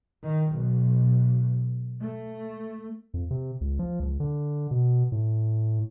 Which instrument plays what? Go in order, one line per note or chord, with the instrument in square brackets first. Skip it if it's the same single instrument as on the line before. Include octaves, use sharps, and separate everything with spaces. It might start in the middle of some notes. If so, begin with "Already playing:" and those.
[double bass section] D#3
B1
A3
[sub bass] F2
C3
C#2
F3
C#2
D3
B2
A2